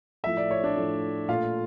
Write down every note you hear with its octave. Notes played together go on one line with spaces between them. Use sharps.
A2 F3 A3 E5
D5
C#5
D4 D5
A2 F3 A3
A#2 A3 F4 F5